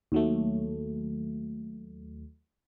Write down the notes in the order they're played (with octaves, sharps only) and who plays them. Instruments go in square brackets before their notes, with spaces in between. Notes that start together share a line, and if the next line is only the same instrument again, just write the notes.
[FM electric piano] D#2 F#3 A3